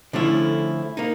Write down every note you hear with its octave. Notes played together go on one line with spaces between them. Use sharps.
D3 F3 A3 C#4 E4
A#3 D#4